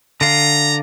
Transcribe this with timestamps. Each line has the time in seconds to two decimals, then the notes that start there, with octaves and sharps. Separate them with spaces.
0.21 D3 F5 A#5